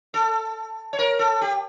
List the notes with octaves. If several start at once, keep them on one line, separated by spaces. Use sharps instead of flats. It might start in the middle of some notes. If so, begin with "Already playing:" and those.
A4
C#5
A#4
A4
G4